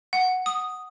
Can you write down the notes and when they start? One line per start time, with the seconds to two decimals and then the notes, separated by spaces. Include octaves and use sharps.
0.13 F#5
0.46 D#6